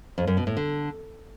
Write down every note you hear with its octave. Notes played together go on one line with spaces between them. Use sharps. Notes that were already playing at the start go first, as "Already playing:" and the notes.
F2
F#2
B2
A2
D3